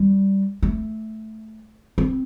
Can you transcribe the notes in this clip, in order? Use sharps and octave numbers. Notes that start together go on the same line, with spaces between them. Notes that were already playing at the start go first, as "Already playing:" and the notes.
Already playing: G3
A3
C4